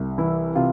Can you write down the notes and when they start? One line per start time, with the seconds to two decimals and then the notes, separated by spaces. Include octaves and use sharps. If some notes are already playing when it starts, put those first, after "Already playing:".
Already playing: C2
0.18 E3 E4
0.56 C3 F4